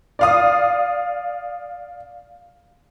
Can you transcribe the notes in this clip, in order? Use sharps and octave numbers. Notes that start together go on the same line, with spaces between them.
D5 F5 D#6